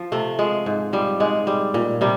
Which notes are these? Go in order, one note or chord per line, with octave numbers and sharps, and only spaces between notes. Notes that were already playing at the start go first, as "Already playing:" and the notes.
Already playing: F3
C3 A3
F3 G#3
G#2
F3 G3
G#2 G#3
G3
A#2
C3 G3